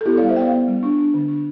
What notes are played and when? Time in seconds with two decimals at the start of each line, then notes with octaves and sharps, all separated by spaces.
0.01 A4
0.06 B3 E4 G4
0.17 G3 D5 F5
0.29 C5 E5
0.36 B3 D5 F5 G5
0.52 B3
0.68 G3
0.83 D4
0.98 D4
1.14 D3
1.28 D4